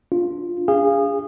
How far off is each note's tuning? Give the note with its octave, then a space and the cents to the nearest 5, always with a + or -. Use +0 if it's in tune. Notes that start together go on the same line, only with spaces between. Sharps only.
D4 +0 F4 +0
D4 -40 G#4 -25 F5 -15